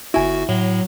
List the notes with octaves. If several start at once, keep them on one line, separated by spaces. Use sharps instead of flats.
G1 E4 F#4 G#5
A2 F#3